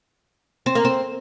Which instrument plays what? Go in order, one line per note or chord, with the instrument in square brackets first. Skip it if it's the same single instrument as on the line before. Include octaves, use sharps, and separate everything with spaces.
[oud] C4
A#3
C4